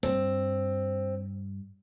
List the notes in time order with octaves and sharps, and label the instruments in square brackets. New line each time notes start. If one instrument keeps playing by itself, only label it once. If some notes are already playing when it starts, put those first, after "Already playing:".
[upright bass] G2 [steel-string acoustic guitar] C4